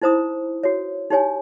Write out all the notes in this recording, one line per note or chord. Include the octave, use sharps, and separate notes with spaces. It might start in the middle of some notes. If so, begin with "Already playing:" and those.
D#4 E4 C5 A#5 D#6
F#4 C#5
D#4 G4 C#5 G#5